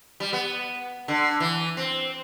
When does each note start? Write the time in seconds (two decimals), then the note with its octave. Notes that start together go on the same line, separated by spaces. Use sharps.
0.20 G3
0.33 B3
1.08 D3
1.40 E3
1.77 C4